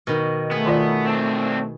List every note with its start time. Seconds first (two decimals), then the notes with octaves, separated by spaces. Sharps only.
0.07 B2 D#3
0.51 A3 B3 G#4
0.66 D#3 F4 D5
1.05 C4 D4